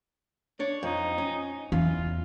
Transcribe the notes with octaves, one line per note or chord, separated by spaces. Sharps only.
D4 C#5
F2 D#4
C#4
E2 E4 F4